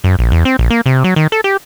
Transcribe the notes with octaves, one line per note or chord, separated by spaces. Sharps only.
F#2
A#1
E2
C4
A#1
A#3
C3
F#3
D#3
A4
G4